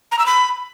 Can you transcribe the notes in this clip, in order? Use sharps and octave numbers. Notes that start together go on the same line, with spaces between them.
A#5
E6
B5